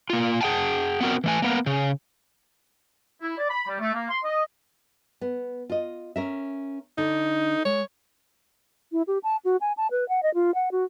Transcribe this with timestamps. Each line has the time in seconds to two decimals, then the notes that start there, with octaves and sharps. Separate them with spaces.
0.10 A#3 F4
0.41 G#4 F#5 G5 A5
1.01 B3 C4 F#4 A#4
1.24 E3 A3 G#5
1.42 A#3 B3 A#4
1.66 C#3
3.21 E4
3.37 D5
3.49 B5
3.67 G3
3.79 A3
3.93 A#3
4.08 C6
4.23 D#5
5.21 B3
5.69 F4 D#5
6.16 C#4 A#4 E5
6.98 D3 D#4
7.65 G#3 C#5
8.92 E4
9.07 G4
9.23 A5
9.45 F#4
9.61 G#5
9.77 A5
9.91 B4
10.09 F#5
10.23 D#5
10.34 F4
10.55 F#5
10.72 F#4